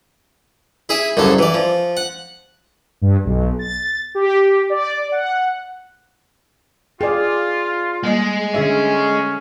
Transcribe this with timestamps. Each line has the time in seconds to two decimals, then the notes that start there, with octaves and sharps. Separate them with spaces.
0.89 E4 G#4 E5
1.17 C2 F#2 C#3 A4
1.39 E3 D5
1.54 F3
1.97 F#5
3.02 G2
3.25 B1
3.59 A6
4.15 G4
4.70 D5
5.12 F#5
7.01 F4 G#4 D5 G5
8.03 G3 G#3 A#3 D#5
8.54 D3 C#4 G#4 E5